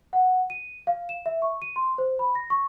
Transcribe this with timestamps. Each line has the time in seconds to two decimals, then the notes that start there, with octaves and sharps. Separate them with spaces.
0.13 F#5
0.50 D#7
0.87 F5
1.09 E7
1.26 E5
1.42 C#6
1.62 D#7
1.76 C6
1.98 C5
2.19 B5
2.35 A#6
2.50 C#6